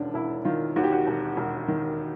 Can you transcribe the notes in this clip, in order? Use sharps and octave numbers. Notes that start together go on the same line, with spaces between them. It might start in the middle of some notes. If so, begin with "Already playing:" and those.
Already playing: E1 D#2 C#4 D4
E1 E4
D#3 F4
D#2 F#4
G4
F#4
E1
E1
D#3